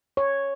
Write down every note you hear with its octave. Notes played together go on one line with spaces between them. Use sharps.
C#5